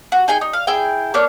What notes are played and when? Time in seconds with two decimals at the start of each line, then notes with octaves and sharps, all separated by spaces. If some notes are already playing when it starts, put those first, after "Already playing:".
0.12 F#4
0.28 D#4 G#4 G5 G#5
0.41 D#4
0.53 F5
0.67 E4 G#4 G5
1.14 A3 A#3 D4 C#5